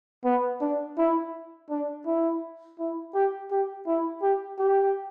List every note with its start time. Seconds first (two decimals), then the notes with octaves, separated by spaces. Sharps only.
0.25 B3
0.61 D4
0.98 E4
1.70 D4
2.06 E4
2.79 E4
3.14 G4
3.51 G4
3.87 E4
4.22 G4
4.59 G4